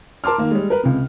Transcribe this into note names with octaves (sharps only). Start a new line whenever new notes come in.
A#4 A5 C6 D6 F6
D#3 A#3
G3 G#3
A#4 B4
C#2 C3